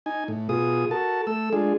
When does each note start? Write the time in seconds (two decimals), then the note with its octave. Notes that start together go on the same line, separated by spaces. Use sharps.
0.06 D#4 G#5
0.28 A2
0.49 B2 F4 G#4 D#6
0.91 F#4 A4 A#4 A5
1.27 A3 A4 E6
1.53 G#3 D4 F4 G#4